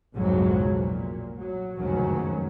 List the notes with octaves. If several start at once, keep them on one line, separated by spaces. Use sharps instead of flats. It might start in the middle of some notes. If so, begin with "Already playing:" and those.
B1 F2 G#2 C#3 F#3
A#2
F#3
F1 C#2 F#2 D#3 F#3 C#4